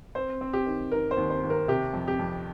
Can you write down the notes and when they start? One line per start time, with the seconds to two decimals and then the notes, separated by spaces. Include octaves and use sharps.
0.15 C4 C5
0.41 C4
0.53 G4
0.66 D#3
0.91 D#3 A#4
1.11 C5
1.17 D#2
1.30 C5
1.43 D#2
1.50 A#4
1.68 C3 G4
1.94 F2
2.08 G4
2.19 F2